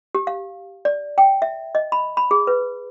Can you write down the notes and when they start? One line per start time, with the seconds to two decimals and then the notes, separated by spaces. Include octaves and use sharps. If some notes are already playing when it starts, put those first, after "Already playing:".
0.15 G4
0.27 F5
0.85 D5
1.18 G5
1.42 E5
1.75 D#5
1.92 B5
2.17 B5
2.31 G#4
2.47 B4